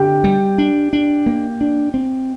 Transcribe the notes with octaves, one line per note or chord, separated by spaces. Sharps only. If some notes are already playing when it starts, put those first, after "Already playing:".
Already playing: D3 G4 G5
G3
D4
D4
A#3
D4
C4